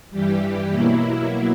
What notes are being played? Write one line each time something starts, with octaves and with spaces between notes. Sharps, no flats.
G2 E3 G3 G4
B2 F#3 A#3 E4